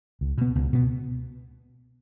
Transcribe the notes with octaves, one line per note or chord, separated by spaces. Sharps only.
C#2
B2 B3
C#2
B2 B3